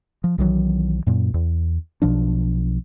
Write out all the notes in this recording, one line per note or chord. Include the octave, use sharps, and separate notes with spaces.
F3
B1 D#3 E3 F#3
F#2 A#2
E2
B1 B2 F3 D4